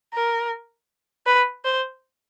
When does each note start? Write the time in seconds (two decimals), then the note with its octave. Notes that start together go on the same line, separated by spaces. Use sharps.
0.14 A#4
1.26 B4
1.65 C5